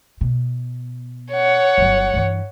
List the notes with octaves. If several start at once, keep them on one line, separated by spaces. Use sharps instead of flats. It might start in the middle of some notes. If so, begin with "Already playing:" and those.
B2
C#5 F#5
G1 F#3
G2 E3